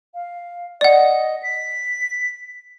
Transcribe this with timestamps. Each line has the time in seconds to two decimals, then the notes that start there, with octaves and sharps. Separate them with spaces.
0.14 F5
0.81 D5 D#5 F#5
1.43 B6